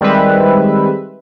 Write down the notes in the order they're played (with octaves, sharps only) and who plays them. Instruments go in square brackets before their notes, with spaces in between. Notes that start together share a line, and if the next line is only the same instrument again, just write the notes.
[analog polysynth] D#3 G3 G#3 C4 B4 E5